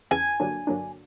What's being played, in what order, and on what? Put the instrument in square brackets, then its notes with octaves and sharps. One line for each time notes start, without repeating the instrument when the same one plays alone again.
[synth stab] E2 C#3 E3 [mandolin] G#5
[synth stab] G2 D3 F#3 A#3 D4
G2 D3 F#3 A#3 D4